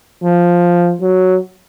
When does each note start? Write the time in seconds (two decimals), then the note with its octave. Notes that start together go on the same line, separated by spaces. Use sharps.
0.23 F3
1.01 F#3